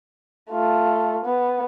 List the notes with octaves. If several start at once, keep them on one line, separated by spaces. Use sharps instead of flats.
A3 F4
B3